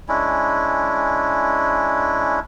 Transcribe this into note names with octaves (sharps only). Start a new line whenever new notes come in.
G#3 C#4 D4 E4